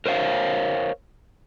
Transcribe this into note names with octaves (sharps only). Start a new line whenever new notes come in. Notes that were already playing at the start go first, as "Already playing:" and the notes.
A#4 C5 C#5 F5